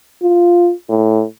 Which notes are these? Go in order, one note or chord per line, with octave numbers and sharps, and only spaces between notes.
F4
A2